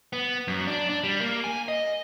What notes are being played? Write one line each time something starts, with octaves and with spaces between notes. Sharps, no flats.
B3
F#2
D4
D4
G3
A#3
G#5
D#5